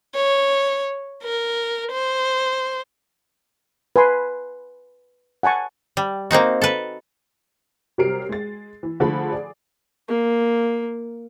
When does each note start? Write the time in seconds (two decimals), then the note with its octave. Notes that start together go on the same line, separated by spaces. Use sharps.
0.15 C#5
1.24 A#4
1.92 C5
3.96 B4 G#5 C6
5.43 F#5 G#5 A5 C#6
5.97 G3
6.31 A#3 C4 D#4 F#4
6.62 A4 B4
7.98 C3 F#3 G3 A#4 C7 D7
8.29 G#3 A6
8.83 E3
9.00 D3 F3 A3 G#4 A4 B5
9.32 G#4 D5
10.09 A#3